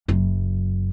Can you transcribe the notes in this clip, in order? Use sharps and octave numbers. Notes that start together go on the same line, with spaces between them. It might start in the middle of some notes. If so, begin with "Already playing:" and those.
F#1 F#2